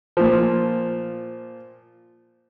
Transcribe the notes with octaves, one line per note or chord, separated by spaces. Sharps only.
A#2 F3